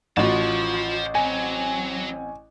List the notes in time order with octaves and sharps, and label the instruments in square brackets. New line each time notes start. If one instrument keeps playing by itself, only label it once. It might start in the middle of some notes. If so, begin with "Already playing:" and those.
[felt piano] A1 F#4 [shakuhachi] F4 [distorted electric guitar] C5 A5
[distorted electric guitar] F#3 [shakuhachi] C4 [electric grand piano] G#5